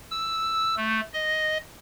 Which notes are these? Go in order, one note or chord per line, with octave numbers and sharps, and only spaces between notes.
E6
A3
D#5